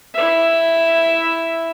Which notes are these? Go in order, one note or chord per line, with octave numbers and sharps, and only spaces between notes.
E4 E5